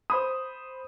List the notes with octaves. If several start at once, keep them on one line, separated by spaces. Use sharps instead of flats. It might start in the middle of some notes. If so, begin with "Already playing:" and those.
C5 B5 D#6